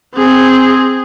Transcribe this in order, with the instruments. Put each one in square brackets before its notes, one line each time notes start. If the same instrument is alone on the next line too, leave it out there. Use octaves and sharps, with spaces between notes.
[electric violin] C4 G#4